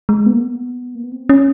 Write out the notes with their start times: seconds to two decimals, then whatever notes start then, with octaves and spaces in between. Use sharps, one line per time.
0.09 G#3
0.26 B3
0.33 A#3
0.41 B3
0.95 A#3
1.04 B3
1.12 C4
1.29 C#4